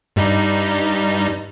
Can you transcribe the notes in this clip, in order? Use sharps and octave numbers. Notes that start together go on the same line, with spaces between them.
G2 G3 D#4